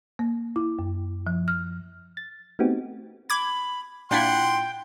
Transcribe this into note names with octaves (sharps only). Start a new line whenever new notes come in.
A#3
E4
F#2
F3
F6
A6
A3 B3 C4 D#4 F#4 G4
B5 D6 G#6
A#2 D4 E4 F#5 G5 C6